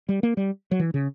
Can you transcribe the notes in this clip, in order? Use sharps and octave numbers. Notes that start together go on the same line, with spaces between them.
G3
A#3
G3
F#3
E3
C#3